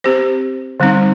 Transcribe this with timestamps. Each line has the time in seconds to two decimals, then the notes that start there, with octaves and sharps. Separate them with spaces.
0.04 C4 G4 C5
0.80 D3 G3 C4 D#4